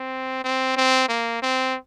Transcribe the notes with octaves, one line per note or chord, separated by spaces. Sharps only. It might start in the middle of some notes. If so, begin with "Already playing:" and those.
Already playing: C4
C4
C4
A#3
C4